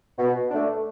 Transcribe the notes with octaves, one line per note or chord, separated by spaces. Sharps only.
B2
A3 D4